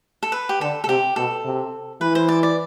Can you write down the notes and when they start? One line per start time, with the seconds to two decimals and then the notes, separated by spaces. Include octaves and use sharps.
0.23 A4
0.32 B4
0.49 G4
0.61 D3 A4
0.84 A4
0.88 C3 G4
1.16 B2 A4
1.45 C3
2.01 E3 B4
2.15 C5
2.28 D5
2.43 D5